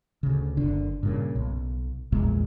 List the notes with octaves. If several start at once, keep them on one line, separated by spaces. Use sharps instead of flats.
D2 C#3
F#1 D3 D4
G2 A#2 C#3
B1
A#1 E2 A#2 G#3